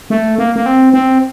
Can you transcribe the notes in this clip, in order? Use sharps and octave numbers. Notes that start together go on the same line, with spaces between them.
A3
A#3
A#3
C4
C4